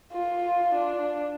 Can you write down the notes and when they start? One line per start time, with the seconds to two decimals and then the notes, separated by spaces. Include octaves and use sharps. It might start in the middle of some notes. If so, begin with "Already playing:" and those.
0.13 F4
0.75 D4